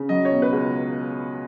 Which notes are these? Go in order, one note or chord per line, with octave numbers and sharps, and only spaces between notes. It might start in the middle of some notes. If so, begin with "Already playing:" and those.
Already playing: C#3
F#3 D#5
C#5
B2
B4
C#2